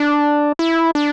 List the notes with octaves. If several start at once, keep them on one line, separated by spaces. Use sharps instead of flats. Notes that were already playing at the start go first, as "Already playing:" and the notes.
Already playing: D4
E4
D4